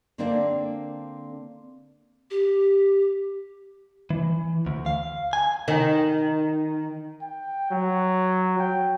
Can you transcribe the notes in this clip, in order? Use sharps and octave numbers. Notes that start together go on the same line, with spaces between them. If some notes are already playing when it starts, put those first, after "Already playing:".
D3 A#3 C4 D4 A#4 D5
G4
E3
D2
F5
G#5
D#3
G5
F#3
G5